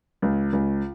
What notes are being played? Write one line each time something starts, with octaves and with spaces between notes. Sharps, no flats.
C#2
C#2